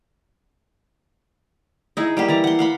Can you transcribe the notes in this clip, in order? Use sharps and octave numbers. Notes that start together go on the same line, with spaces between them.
D#4 E4 G#4
G3 A#3 G4
E3 D5 A#5
F#5 C6
F5 F#5 B5